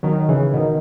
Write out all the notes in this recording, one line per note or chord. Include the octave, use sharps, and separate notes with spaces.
D#3 F#3
C#3 E3
B2 D#3